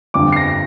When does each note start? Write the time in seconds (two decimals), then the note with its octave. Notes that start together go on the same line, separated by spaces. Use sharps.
0.14 G1 F2 D3 F3 D6
0.33 C7
0.36 A#6